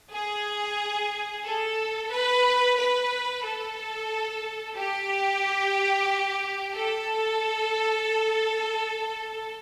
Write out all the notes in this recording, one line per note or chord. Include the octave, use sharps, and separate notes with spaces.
G#4
A4
B4
B4
A4
G4
A4